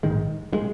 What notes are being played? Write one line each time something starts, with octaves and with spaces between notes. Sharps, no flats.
A#1 G#2 D#3 G#3
D#3 G#3